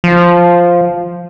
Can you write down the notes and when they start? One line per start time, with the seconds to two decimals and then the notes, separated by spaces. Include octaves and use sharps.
0.04 F3